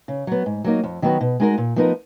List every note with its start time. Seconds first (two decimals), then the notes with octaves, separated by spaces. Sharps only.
0.08 C#3
0.27 F#3 B3
0.46 G#2
0.64 F#3 A#3 D#4
0.83 F2
1.02 D#3 F#3 B3 F#4
1.21 B2
1.40 G#3 D#4 F#4 A#4
1.58 A#2
1.76 F3 B3 D#4 A#4